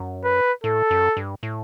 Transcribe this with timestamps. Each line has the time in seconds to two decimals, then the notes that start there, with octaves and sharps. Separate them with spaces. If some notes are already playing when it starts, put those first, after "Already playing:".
Already playing: F#2
0.24 B4
0.63 A2 A4
0.90 F#2
1.17 G2
1.43 A2